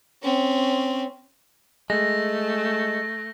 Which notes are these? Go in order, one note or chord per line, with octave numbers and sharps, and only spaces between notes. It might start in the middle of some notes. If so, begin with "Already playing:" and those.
C4 C#4
G#3 A3 A#6